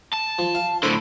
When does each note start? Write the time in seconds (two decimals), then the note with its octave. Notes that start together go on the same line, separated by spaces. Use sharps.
0.13 A5
0.39 F3
0.55 F5
0.83 A2 D3 A4 C5 B5